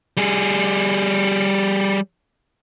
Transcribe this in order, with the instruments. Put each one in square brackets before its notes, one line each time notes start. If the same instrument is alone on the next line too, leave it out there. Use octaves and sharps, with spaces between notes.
[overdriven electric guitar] G3 G#4